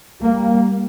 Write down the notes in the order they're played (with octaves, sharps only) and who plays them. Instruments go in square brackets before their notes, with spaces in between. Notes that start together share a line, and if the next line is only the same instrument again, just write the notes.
[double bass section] G3 A#3